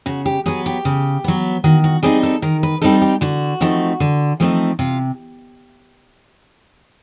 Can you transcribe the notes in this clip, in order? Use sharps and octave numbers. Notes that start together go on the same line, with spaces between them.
C#3 F#4
G4
F#3 B3 G#4
G4
C#3
F#3 B3
D#3 F#4
F#4
G3 C4 D#4 G#4
A4
D#3 A#4
B4
G3 C4 D#4 A4
G4
D3 F#4
F3 A3 C4 D#4
D3
F3 A3 C4 D#4
C3 F4